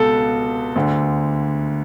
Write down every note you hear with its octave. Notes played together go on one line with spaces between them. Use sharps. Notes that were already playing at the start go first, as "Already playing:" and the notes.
Already playing: C#2 B2 A4
D2 D3